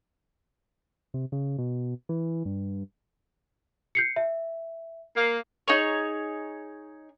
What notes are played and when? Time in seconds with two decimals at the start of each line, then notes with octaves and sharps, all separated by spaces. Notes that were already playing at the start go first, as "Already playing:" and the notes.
1.14 C3
1.32 C#3
1.58 B2
2.09 E3
2.45 G2
3.95 G6 C7 C#7
4.16 E5
5.16 A#3
5.68 D#4 G#4 C#5